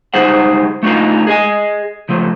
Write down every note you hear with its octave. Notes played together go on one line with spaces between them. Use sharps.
C#2 G3 D#4 G#4 C5 F#5
A3 B3 D4 D#4 F4 A#4
G#4 D#5 G#5
C#3 F3 A3